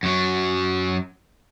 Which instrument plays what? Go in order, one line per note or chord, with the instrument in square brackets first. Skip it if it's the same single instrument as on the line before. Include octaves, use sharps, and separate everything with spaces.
[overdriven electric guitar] F#2 F#3